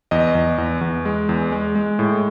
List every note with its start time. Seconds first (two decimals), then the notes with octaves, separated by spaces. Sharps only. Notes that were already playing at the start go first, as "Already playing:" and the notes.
0.11 E2 D#5
0.35 E2
0.58 E2
0.81 E2
1.05 G#3
1.29 E2
1.52 G#3
1.75 G#3
1.99 A2